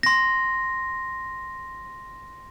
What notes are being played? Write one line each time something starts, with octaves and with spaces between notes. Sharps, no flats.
C6 A#6